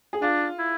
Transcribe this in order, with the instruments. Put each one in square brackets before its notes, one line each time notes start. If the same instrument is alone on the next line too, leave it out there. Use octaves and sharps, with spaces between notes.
[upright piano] G#4
[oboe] D4 [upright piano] F4
[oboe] E4